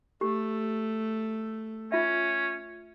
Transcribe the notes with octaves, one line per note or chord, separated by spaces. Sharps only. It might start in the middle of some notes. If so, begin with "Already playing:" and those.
A3 G4
C#4 F4 E5